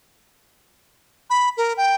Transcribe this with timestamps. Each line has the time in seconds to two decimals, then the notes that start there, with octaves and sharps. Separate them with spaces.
1.30 B5
1.57 A#4
1.77 G5